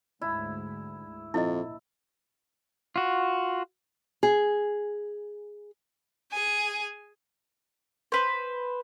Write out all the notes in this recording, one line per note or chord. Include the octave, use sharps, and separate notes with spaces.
D2 G#2 E4
A#1 F2 E4 D#5
F4 F#4
G#4
G#4 G#5
B4 C5